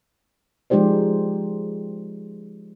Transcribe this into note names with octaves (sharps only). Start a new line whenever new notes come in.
F3 G#3 D#4 G4 C5 D5